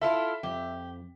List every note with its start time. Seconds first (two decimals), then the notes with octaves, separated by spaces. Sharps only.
0.01 E4 F4 A4 E5
0.43 F2 G4